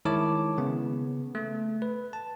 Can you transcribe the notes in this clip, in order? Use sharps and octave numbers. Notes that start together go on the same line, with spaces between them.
D#3 G#3 E4 C#5 A5 D6
C#3 B3
A3
B4
A5